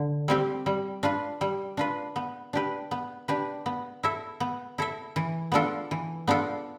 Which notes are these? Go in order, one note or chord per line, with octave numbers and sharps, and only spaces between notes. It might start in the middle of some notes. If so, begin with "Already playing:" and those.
Already playing: D3
G3 C4 G4
G3
D4 F4 B4
G3
D4 F4 B4
B3
D4 G4 B4
B3
D4 G4 B4
B3
E4 A4 E5
B3
E4 A4 E5
E3
B3 D4 F4 A4
E3
B3 D4 F4 A4